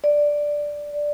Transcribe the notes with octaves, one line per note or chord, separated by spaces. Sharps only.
D5